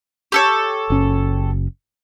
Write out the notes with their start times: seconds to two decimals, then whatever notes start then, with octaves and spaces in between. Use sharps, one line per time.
0.32 G4 A4 C#5
0.90 F#1 C#4